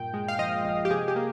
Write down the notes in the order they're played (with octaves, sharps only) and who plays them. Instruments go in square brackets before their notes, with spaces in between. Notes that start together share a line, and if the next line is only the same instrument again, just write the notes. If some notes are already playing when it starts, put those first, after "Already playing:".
Already playing: [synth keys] G2 A#2 G5
G#3
F5
F3 D#5
A#1
G4
C3 G#4
G4
A#3